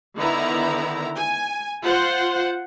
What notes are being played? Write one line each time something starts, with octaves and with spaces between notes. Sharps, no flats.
D3 D#3 B3 E4 A#5
G#5
F4 C5 F#5